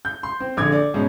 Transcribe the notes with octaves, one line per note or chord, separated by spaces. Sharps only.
G6
C6
C4
A#1 D3 D6 G#6
D5
G#2 B2 C#4